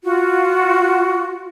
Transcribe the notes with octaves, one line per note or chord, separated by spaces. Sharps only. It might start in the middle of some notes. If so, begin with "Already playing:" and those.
F4 F#4